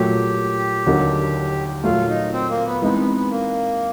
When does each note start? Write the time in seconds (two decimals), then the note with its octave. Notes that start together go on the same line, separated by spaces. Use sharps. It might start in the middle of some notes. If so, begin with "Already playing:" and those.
Already playing: A#2 F#3 A3 G4
0.86 D#2 D3 F#3 A#3 D#4
1.83 A#2 F#3 A3 F4
2.08 D#4
2.33 C4
2.49 A#3
2.65 B3
2.82 E3 G#3 B3 C4 D#4
2.98 B3
3.14 B3
3.30 A#3